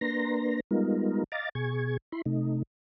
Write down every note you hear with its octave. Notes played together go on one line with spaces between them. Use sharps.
A#3 D4 B4 A#5 C6 A#6
G3 G#3 B3 D#4 F4 A#4
D#5 F5 A#5 D6 A6
B2 G#4 C#6 G#6
E4 B5 C6
C3 A3 D#4